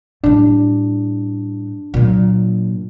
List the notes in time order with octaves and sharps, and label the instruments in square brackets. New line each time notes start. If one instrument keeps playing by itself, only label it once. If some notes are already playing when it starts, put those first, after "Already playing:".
[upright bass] A2 G3 [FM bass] D4
[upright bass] A#2 F#3